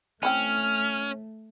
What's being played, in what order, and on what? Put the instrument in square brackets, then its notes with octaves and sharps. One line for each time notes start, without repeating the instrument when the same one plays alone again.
[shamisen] E3 C4 G5 [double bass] A3 [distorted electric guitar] C#4 [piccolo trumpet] F6